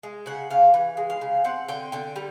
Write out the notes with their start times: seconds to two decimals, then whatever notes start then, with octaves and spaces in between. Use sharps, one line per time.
0.03 G#3
0.26 C#3 F#5
0.50 C#3 F5
0.74 E3
0.97 G#3
1.10 F5
1.21 C#3
1.44 C4 F#5
1.69 D3 G5
1.92 D3 G5
2.16 G3